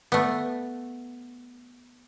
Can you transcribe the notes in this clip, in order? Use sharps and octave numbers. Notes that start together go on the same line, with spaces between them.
A3 B3